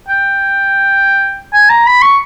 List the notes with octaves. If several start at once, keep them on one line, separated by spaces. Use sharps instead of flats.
G5
G#5
A#5
B5
C#6